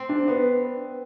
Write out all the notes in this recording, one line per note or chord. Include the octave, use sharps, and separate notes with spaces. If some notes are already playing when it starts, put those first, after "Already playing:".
Already playing: C4
D4
B3